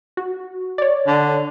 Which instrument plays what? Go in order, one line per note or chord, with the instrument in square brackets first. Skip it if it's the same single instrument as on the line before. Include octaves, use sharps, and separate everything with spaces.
[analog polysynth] F#4
C#5 D5
[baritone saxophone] D3